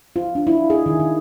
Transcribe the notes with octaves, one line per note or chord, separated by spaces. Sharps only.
F4
D4
E4
G#4
D#3
D#3